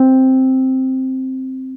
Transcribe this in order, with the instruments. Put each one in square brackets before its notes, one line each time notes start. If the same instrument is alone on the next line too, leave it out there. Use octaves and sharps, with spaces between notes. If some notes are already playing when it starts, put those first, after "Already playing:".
Already playing: [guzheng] C4